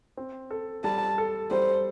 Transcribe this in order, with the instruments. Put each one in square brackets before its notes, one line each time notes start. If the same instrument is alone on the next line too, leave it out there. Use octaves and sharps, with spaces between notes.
[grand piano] C4
A4
[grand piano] G3 [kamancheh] A5
[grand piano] A4
[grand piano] G3 [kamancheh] C5